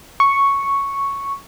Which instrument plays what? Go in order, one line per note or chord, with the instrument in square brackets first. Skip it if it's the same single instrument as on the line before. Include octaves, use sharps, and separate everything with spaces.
[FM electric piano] C#6